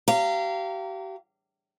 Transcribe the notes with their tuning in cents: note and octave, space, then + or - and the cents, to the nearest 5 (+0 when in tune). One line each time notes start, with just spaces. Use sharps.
G4 -35 F5 -30 A#5 -25